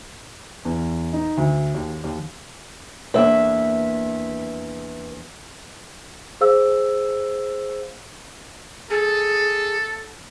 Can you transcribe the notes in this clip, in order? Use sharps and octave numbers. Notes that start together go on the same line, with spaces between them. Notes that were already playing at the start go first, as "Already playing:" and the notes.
E2
D#4
D2
D#2
D#2
E2 A#3 D4 B4 E5
G#4 C5 F5 E6
G#4 A4